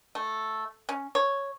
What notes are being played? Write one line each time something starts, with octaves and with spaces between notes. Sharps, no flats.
A3
C#4
C#5